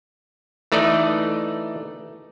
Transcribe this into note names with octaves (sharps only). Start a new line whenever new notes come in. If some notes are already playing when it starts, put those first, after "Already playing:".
E3 A3 D#4 D5 D#5